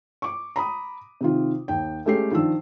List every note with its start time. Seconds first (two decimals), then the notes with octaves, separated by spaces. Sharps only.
0.22 C#6 D6
0.56 A#5 B5 D#6
1.21 C3 D#3 F4
1.68 D#2 G5
2.06 G#3 A3 C#4 G4 A4 C7
2.31 D#3 F3 D4 E6